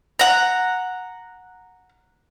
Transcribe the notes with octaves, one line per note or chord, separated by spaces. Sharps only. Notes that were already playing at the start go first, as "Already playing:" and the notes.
F#5 A#5